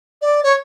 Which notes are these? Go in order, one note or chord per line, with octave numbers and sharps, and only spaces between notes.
D5
C#5